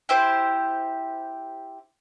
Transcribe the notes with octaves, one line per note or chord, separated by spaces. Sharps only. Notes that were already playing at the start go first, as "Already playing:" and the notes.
E4 G4 C5